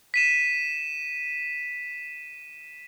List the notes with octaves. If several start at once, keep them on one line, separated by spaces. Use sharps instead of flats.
B6 D#7 E7